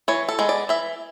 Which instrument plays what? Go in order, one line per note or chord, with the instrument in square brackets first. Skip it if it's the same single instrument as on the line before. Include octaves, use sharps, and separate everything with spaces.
[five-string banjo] E3 C#5
A4
G#3 B3
D5
E3 E5